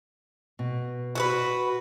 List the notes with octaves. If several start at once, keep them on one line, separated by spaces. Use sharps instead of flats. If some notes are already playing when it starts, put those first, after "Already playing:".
B2
F#4 A4 B4